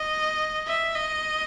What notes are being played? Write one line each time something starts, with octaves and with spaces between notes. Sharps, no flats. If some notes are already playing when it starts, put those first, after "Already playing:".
Already playing: D#5
E5
D#5